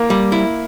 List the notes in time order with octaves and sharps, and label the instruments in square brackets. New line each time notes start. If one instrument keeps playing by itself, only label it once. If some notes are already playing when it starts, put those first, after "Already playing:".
Already playing: [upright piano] A#3
[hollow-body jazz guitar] G3
E4